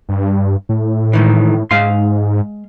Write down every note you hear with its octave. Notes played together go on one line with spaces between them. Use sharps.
G2
A2
G#2 D#3 E3
G#2 G#3 F5 C6